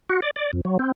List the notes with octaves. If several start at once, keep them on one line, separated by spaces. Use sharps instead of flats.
F#4
D5
D5
F2
F#3
C4